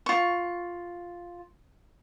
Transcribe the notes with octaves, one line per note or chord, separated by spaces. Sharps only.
F4 C#6